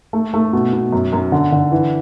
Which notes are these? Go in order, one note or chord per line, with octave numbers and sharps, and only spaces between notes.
A3
A3
B2
B2
F#2
F#2
D3
D3
E3